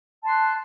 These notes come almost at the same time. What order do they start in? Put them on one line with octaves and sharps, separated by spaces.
A5 C6 F#6